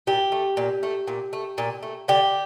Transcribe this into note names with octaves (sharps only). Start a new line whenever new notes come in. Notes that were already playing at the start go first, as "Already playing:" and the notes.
A#2 G4
A3
A#2
A3
A#2
A3
A#2
A3
D3 G4